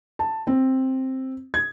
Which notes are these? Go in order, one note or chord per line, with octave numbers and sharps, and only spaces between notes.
A5
C4
G#6